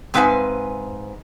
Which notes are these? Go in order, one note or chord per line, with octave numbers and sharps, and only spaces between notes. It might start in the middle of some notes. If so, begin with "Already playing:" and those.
G#2 C4 B4 E5 F5 G#5